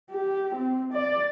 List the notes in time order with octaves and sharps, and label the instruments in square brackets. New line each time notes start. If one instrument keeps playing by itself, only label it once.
[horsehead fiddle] G4
C4
D5